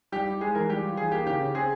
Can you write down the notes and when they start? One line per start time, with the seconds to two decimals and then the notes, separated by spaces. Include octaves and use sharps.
0.12 G3 G4
0.27 E4
0.41 G#3 G#4
0.55 E3 A#4
0.70 G3 G4
0.83 F4
0.97 E3 G#4
1.12 A#3 G4
1.26 C#3 G4
1.41 C#3
1.55 C4 G#4